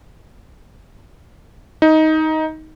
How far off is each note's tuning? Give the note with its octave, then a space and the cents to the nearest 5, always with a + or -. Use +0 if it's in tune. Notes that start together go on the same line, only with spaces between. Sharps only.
D#4 +15